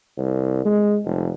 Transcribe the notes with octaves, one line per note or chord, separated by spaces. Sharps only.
C2
G#3
F1